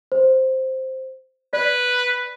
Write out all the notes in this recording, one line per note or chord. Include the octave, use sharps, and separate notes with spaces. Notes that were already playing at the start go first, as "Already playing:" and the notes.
C5
B4 D5